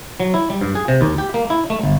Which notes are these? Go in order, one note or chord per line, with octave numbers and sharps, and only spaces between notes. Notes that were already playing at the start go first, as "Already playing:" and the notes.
F#3
E4
G3
G2
G#4
C3
D#2
G4
A#3
E4
A3
G1